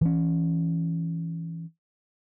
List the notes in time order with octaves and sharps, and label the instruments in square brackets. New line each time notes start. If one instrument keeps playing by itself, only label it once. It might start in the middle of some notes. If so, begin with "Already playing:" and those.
[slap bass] E3 C#4